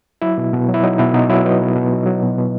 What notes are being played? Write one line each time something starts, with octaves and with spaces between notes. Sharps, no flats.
F#3 E4
B2
B2
F#3
E4
F#3 D#4
B2 E4
B2 D#4
F#3 E4
F#3 B4 D#5
B2
B2
F#3
F#3
B2
B2